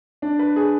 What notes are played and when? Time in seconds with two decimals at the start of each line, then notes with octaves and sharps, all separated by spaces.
0.22 D4
0.39 B4
0.56 G#4